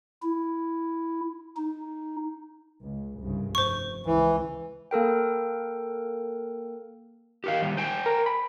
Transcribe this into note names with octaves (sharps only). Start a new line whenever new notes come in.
E4
D#4
C#2
C2 G2 C#3
F1 C5 C#6
C#2 E3
A#3 A4 A#4 G5
G4 A#4 F5
D#3 G3
C5 G5 G#5
A#4
B5